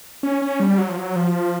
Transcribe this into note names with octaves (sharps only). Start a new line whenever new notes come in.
C#4
C#4
G3
F#3
F3
F#3
F3